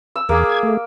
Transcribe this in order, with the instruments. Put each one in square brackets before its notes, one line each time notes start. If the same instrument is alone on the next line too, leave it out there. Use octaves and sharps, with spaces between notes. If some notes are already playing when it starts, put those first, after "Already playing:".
[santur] E6
[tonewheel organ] E2 [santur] A#3 D6 E6 [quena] G#4
[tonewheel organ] G#6
A3